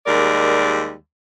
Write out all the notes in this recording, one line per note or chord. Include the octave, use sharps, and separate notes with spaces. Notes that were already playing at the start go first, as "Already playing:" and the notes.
D#2 G3 G#3 A#4 D5